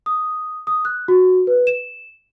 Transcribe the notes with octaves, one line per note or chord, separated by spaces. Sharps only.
D#6
D#6
F#6
F#4
B4
E7